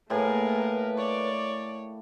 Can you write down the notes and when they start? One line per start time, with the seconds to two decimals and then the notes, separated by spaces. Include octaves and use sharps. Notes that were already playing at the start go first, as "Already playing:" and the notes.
0.10 A2 A3 A#3 G#4 A#4 B4
0.98 C#5 D5